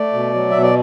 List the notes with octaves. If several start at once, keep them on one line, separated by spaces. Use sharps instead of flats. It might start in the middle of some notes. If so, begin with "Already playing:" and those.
Already playing: A3 D5
B2
F#3
B2 E5
D5